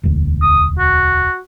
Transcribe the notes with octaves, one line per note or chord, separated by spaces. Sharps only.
E1 D2
D#6
F#4